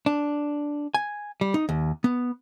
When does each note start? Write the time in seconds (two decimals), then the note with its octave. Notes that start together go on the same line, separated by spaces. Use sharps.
0.06 D4
0.94 G#5
1.41 G3
1.54 D#4
1.69 D#2
2.04 B3